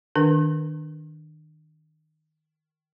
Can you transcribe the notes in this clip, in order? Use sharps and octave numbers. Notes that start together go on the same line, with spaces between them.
D#3 D4 A#4